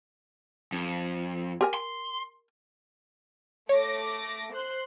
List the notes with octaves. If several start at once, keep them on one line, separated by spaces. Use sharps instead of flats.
F2
G4 A#4 G#5
C6
A3 C#5 D6 A#6
C5 C6 F#6